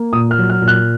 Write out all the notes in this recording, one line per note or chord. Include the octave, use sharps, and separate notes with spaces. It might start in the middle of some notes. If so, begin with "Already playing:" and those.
Already playing: A#3
A#2 D#6
F6
F#3
F6
A#2
F#6